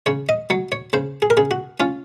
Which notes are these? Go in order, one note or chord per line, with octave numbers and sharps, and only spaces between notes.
C#3 C#5
D#5
F#3 C#5
C#5
C#3 C5
G#4
A#4
C#3 G#4
F#4
C#4 F4